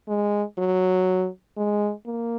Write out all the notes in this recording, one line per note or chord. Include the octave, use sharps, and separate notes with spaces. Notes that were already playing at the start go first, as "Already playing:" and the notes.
G#3
F#3
G#3
A#3